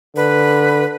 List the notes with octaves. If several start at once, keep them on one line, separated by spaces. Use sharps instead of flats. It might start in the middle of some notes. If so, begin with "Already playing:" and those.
D3 B4